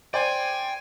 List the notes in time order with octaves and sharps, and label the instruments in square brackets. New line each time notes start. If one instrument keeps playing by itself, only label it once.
[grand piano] C5 D5 [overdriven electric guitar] G5 [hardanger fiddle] G#5